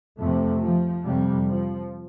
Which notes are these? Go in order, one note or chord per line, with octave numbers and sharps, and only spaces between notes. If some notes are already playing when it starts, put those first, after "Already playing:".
F2 C3 A3
F3
F2 C3 G3
F3